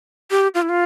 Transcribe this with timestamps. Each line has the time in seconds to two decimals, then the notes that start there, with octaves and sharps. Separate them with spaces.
0.31 G4
0.55 F4
0.62 E4
0.69 F4